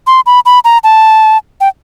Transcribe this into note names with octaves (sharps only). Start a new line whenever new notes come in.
C6
B5
B5
A#5
A5
G5